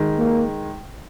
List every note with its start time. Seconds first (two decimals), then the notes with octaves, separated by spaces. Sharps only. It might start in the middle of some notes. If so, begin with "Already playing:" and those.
Already playing: D#3 G#3
0.18 A#3